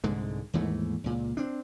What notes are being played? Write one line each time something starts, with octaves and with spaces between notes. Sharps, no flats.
C2 G#2 D3 G#3
D#2 G#2 E3 A3
C#2 A#2
C4 D4